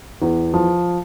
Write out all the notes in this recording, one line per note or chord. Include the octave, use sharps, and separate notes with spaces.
E2
F3